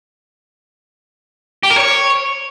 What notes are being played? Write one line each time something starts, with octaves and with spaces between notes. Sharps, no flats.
G4
A#4
C#5